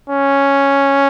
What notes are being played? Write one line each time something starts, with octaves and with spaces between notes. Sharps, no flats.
C#4